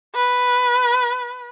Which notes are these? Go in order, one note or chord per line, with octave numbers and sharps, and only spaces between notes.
B4